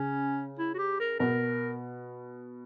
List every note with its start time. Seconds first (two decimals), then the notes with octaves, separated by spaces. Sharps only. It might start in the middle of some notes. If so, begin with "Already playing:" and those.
Already playing: C#3 C#4
0.59 E4
0.74 F#4
0.78 G4
1.00 A#4
1.19 B2 A#4